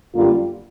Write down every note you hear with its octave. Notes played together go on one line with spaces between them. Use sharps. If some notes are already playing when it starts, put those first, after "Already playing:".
F#2 D3 G3 A#3 F4